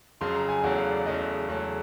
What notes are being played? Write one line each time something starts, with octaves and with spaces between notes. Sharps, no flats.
F2 C#3 F#3 C6
A#5
G#5
E2 C#3 F#3 A3 F#5
F5
D5
E2 C#3 F#3 A3 D#5
E2 C#3 F#3 A3